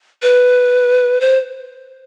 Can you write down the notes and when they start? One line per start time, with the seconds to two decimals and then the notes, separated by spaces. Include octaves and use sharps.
0.22 B4
1.21 C5